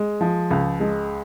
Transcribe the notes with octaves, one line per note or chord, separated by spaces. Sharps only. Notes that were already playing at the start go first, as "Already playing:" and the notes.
Already playing: G#3
F3
C#2
G#3